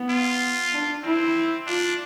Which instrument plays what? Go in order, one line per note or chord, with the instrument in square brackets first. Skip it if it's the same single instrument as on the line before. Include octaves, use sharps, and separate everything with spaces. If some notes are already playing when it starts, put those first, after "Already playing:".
Already playing: [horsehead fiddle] B3
[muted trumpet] F4
[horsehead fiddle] D4
[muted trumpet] C4 [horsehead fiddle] E4
[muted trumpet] D4 [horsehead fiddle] F4